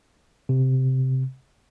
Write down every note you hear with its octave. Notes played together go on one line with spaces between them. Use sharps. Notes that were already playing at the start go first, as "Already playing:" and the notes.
C3